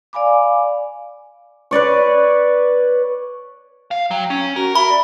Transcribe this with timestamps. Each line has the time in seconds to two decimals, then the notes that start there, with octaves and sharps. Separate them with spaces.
0.13 D5 F5 G#5 B5 D6
1.71 B4 C#5 D5 C#6
3.91 F5
4.11 F#3 G5
4.30 C#4
4.56 F#4 A#4
4.75 E5 B5
4.89 D5